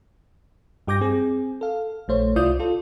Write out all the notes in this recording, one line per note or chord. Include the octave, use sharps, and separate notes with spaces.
G2 G4 D6 G6 A#6
C4 G#4
A4 F5
A#1 A3 C5 C#5
C2 E4 F4 D5 D#6 G6
F4 A4